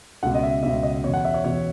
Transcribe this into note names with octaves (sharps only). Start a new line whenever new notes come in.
C#2 B2 F#5
D#5
E5
C#2 B2 E5
D#5
E2 B2 C#5
F#5
E5
C#5
E2 B2 C#5